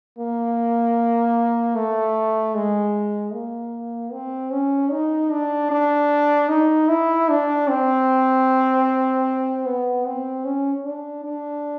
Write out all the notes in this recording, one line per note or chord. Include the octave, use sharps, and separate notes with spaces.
A#3
A3
G#3
A#3
C4
C#4
D#4
D4
D4
D#4
E4
D4
C4
B3
C4
C#4
D4
D4